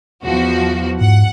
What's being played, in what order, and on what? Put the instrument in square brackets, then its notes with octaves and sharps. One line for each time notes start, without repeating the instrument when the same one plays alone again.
[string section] E2 F3 F#4
[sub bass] G#2 [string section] F#5